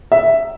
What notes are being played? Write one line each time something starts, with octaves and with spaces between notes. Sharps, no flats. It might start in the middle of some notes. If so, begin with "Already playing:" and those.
E5